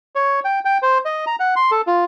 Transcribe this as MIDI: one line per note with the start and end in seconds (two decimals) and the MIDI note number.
0.15 0.40 73
0.45 0.60 79
0.65 0.78 79
0.82 0.98 72
1.05 1.25 75
1.27 1.36 82
1.40 1.55 78
1.56 1.71 84
1.71 1.81 69
1.87 2.05 65